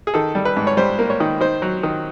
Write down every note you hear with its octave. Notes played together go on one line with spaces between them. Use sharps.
G#4
D#3 A4
G3
B4
G#2
C#5
G3 C5
A#3
C#5
D#3
D#3 C5
F#3
D#3